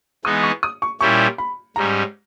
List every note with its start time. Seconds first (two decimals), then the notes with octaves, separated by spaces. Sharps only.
0.25 E3 G#3 B3 D#4 D#6
0.43 C#6
0.63 D#6
0.82 C#6
1.01 A#2 G3 C#4 E4 G4 C#6
1.38 B5
1.76 G#2 G3 C#4 A#5